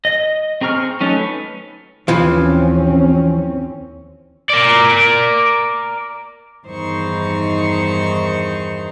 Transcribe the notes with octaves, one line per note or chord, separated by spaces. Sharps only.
D#5
C4 G#4 A#5 C#6 F6
F#3 A3 C#4 D#4
B4
D#2 E3 F3 C4 C#4
A#4 D5
E2 G2 D#3 D#4 C5 C#6